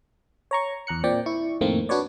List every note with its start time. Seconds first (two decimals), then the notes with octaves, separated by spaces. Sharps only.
0.51 C#5 A#5 C#6
0.87 E2 A#5 F#6 C#7
1.04 A#2 C4 D5 G5
1.26 E4 C#6
1.61 F2 A2 D#3 A3 A#3 C4
1.89 D4 F#4 B4 C#5 D5